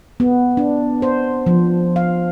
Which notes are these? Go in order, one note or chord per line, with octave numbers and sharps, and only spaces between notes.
B3
D4
C5
F3
F5